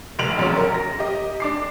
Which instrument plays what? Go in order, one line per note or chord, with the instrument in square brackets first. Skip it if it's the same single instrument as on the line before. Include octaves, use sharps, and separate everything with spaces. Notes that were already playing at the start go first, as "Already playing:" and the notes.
[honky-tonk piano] F1 B1 D7 F7 F#7
A#1 F#2 C#3 F#3 C#5
A#4
A#6
G4 D#5
D4 D6 C7